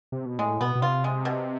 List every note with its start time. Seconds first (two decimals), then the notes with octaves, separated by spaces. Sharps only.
0.12 C3
0.26 B2
0.39 A2 G#3
0.61 B2 B3
0.75 B2
0.82 C3 F4
1.04 G#3
1.25 B2